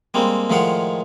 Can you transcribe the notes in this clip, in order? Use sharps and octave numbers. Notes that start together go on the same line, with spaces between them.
G3 G#3 A#3 C4
A2 D#3 F3 G#3 F5 F#5